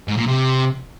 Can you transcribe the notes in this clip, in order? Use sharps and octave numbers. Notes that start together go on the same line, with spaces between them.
G#2
A#2
C3